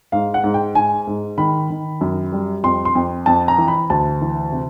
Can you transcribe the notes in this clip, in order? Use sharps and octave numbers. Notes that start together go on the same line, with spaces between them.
G#2 F5
F#5
G#2
G5
G#2 G#5
G#2
D#3 B5
D#3
F#2
G3
F2 C6
C6
F2
F2 A5
A#5
E3
B5
D2 A5
E3
C3